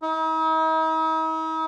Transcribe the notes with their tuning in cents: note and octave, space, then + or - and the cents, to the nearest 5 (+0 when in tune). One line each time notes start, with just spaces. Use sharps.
D#4 +45